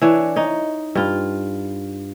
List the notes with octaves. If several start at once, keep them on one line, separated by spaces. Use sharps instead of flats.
E3 D4 C#5
D#4 C#5
G2 F4